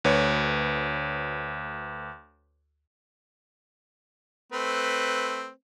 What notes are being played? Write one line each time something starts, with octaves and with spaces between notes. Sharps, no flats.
D2 B4 C#5
A3 C4 B4